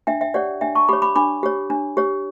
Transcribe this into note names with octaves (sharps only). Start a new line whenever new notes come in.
D4 E5 G5
E5 G5
G4 C#5 D5 F#5
D4 E5 G5
A5 C#6
G4 C#5 B5 D6
B5 D6
D4 B5 D6
G4 C#5
D4
G4 C#5